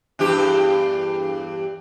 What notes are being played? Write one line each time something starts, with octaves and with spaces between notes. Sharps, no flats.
E2 G2 G4